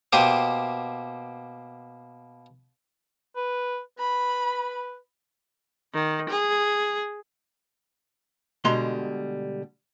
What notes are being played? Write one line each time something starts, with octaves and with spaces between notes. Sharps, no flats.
B2 A#3 G4 C5 D6 D#6
B4
B4 B5
D#3
G#4
B2 D3 G3 G#3 A#5 C6